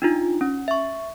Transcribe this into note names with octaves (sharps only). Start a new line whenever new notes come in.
D4 D#4 F4
C#4
E5 C#6